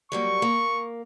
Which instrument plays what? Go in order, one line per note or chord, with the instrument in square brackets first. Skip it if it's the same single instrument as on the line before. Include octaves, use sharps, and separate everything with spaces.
[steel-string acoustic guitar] F#3 G3 A#3 [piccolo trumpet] C#6
[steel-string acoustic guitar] A#3